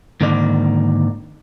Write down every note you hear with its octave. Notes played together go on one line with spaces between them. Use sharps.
G#2 D3 D#3 A#3 D5